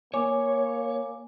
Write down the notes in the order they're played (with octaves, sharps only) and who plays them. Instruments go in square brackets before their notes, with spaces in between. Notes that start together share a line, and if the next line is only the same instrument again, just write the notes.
[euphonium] A#3 [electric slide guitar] C#5 [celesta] G#5 D6